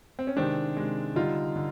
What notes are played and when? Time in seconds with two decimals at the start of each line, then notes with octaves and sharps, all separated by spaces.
0.19 C4
0.27 C#4
0.36 C3 D#3 G#3 C4 D4
0.77 C3 D#3 G#3
1.16 D3 G3 D#4 F4
1.56 D3